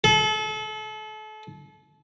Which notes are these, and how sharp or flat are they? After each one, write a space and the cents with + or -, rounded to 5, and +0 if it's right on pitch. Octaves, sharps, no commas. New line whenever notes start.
A4 -35